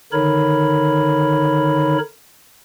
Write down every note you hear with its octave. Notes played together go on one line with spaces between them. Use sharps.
D3 D#3 D#4 A#4 C#5 B5